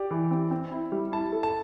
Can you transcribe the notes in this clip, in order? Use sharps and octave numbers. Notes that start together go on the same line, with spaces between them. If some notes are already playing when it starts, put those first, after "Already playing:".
Already playing: G4 D5
E3
C4
C4
E4
G3
E4 A5
A4
A5